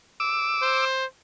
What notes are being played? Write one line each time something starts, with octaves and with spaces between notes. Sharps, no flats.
D6 E6
C5